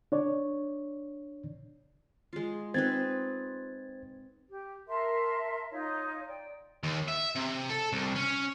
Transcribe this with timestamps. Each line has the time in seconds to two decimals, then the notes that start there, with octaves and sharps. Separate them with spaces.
0.12 D4 C#5 D5
2.33 G#3 F4
2.74 C4 D#4 B4 C5 G#6 A6
4.49 G4
4.88 A#4 E5 A5 C6
5.71 D#4 F4 C#5
6.27 D5 G5
6.83 D#2
7.08 E5
7.35 C3
7.69 A4
7.93 C2
8.16 C#4